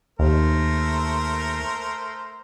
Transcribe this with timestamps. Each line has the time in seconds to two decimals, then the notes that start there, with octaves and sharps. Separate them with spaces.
0.19 D#2 A3 A#4 C5